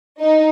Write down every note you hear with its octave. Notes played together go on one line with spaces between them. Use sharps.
D#4